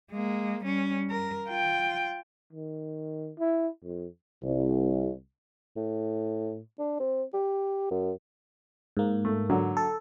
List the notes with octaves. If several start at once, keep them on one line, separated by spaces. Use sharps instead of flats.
G#3 A#3
G3 C#4
A#4
F4 G5
D#3
E4
F2
C2
A2
D4
C4
G4
F#2
G#2 A#3
A3
D3 F#3
A4